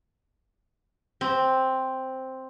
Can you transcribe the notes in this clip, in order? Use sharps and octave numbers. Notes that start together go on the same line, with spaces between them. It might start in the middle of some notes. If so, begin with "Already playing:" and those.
C4